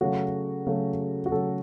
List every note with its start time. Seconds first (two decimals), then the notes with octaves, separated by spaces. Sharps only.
0.01 C#3 F#3 A3 F#4
0.66 C#3 F#3 A3
1.26 F#4
1.32 C#3 F#3 A3 A4